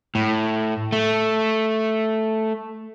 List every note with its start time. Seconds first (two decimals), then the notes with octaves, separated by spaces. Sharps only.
0.15 A2
0.92 A3